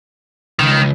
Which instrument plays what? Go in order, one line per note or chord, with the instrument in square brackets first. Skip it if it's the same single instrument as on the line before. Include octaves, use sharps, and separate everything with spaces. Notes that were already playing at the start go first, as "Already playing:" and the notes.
[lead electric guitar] C#2 [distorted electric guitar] D#3